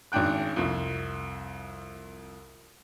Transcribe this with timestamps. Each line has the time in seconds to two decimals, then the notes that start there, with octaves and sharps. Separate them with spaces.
0.12 G#1 C#3 D4 G5 F#6
0.56 C2 F2